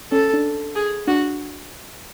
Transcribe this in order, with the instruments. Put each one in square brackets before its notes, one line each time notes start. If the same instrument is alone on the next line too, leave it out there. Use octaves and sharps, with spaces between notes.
[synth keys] C#4 [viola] A4
[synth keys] C#4
D4
[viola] G#4
[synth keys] D4 [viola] F#4